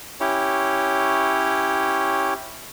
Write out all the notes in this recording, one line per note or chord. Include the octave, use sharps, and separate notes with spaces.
C#4 E4 G4 C#5